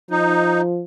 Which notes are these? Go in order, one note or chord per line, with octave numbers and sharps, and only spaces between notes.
F3 D#4